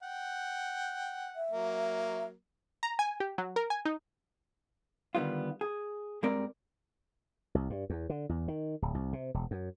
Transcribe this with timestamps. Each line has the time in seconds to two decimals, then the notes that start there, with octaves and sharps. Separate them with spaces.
0.03 F#5 G5
1.36 E5
1.51 F#3 A#3
2.83 A#5
2.99 G#5
3.20 G4
3.38 F#3
3.56 A#4
3.70 G#5
3.85 D#4
5.15 D3 D#3 G3 B3 F4
5.61 G#4
6.23 G2 G3 G#3 C4 A#4 D5
7.55 C2
7.70 G2
7.90 E2
8.09 D3
8.29 E2
8.48 D#3
8.82 D1
8.95 C2
9.13 C3
9.34 E1
9.51 F#2